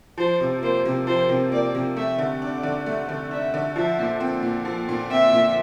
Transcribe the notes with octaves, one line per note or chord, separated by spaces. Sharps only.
F3 C5
C3
A#3 C5
C3
F3 C5
C3
A#3 D5
C3
A3 E5
D3
D4 D5
D3
A3
D3
D4 E5
D3
F3 E5
A#2
C4
A#2
F3
A#2
C4 E5
A#2